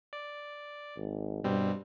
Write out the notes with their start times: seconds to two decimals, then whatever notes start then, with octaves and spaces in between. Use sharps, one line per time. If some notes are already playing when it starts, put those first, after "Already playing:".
0.13 D5
0.97 G#1
1.44 G2 B2 G3 C4